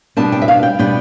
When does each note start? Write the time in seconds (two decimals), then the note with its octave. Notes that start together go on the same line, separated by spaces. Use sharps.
0.17 B2 G3 B3 D4 A5
0.32 G5
0.42 E5
0.48 F5
0.63 G5
0.79 B2 G3 B3 D4 G5